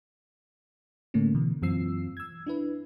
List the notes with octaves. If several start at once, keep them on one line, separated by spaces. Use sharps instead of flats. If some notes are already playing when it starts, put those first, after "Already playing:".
A2 D3 A3 A#3 C#4
B2 D3 E3
F#2 E3 C4 F4 E6 C7
E6 G#6
D4 E4 B4